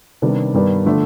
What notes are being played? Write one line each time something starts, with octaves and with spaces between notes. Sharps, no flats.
C3 D#3 G3 B3 D4
G2 D#3 G3 B3 D4
D3 F3 A3 D4